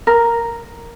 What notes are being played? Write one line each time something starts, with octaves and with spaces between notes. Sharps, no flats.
A#4